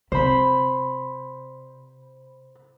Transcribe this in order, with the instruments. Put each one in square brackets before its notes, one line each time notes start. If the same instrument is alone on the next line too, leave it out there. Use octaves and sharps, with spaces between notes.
[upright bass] C3 [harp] C5 B5